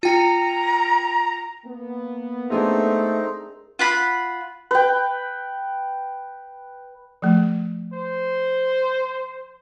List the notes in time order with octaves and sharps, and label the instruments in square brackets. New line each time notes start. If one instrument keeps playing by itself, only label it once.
[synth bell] F4 G5 C#7 [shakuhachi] A#5
[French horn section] A#3 B3
[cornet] A3 [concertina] C4 D#4 [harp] D4 G#4 A#4
[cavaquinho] F4 F#5 B5
[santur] B4 G5
[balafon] F3 A3
[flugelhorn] C5